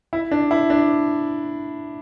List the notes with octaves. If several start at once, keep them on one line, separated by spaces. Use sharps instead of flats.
E4
D4
E4
D4